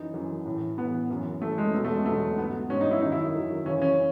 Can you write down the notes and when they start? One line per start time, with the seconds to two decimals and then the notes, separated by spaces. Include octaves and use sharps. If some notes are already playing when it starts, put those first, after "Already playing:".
Already playing: F#2 E3 D#4
0.14 F#2 E3
0.46 A2 E3
0.78 A2 E3 B3
1.10 F#2 E3
1.42 F#2 E3 A3
1.58 G#3
1.74 E2 B2 F#3 A3
1.85 A3
1.95 G#3
2.06 E2 B2 F#3 A3
2.38 G#2 F#3 B3
2.70 G#2 F#3 C#4
2.81 D#4
2.91 E4
3.02 F#2 D#3 F#3 D#4
3.12 E4
3.34 F#2 D#3 F#3
3.66 F#2 C#3 E3 C#4
3.82 C#4